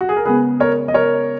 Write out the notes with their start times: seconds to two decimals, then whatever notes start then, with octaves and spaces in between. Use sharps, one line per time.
0.01 F#4
0.09 G#4
0.17 A#4
0.25 C#3 G#3 B3 G#4 B4
0.60 A#4 C#5
0.88 D#5
0.94 A#4 C#5